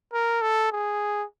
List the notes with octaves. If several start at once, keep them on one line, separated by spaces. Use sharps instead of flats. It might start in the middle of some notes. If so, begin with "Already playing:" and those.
A#4
A4
G#4